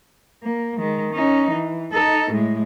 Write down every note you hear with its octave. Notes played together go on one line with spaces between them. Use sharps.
A#3
D#3 G#3
C#4 D#4
E3
D#4 A4
A2 G#3